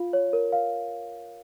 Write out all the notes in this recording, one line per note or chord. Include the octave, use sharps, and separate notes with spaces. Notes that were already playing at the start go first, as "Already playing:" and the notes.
Already playing: F4 F5
C#5
A#4
F5